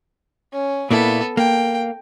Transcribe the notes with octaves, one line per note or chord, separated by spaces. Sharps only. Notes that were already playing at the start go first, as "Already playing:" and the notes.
C#4
A#2 A#3 B3 E4 A4
A#3 G5